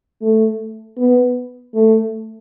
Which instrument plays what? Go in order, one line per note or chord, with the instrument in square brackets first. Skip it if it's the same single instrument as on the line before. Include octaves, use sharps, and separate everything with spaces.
[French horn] A3
B3
A3